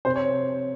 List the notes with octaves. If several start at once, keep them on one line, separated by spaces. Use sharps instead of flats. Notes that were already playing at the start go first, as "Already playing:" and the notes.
C3 C5
C#5